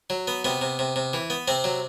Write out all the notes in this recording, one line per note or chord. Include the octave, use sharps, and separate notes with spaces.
F#3
B3
C3 B3
C3
C3
C3
E3
B3
C3 C4
F#3